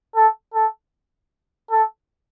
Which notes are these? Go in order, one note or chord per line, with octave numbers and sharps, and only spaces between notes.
A4
A4
A4